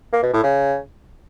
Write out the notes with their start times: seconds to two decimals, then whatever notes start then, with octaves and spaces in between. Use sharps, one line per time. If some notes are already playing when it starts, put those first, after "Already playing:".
0.12 A#3
0.23 B2
0.33 A2
0.44 C#3